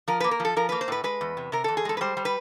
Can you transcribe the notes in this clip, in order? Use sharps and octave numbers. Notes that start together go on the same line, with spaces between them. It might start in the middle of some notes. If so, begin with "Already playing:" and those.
F3 A#4
A#3 B4
A#4
F3
A4
F3 A#4
A#3 B4
C5
A2 B4
G#3 B4
E2
C3
C3 A#4
E2 A4
G#4
G#3 A4
B4
G3 C5
G3
B4